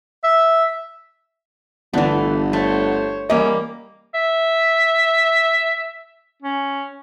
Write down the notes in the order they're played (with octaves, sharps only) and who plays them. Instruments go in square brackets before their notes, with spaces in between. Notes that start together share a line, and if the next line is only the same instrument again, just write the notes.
[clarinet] E5
[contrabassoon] G1 [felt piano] D3 B3 D4 [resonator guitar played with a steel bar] E3 A3
[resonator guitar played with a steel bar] A3 [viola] C5 C#5
[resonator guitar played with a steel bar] E2 C#4 [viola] G3 A#3 [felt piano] D#5
[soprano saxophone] E5
C#4